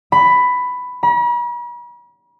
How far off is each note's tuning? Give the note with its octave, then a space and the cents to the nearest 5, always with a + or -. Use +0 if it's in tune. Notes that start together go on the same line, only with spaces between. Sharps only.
B5 +10
B5 -45